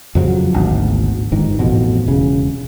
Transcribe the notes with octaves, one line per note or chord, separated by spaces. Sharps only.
F2 C#3 F3 F#3
G#1 D2 B2 D3
G1 G#2 D#3
A1 F2 B2
E1 C#3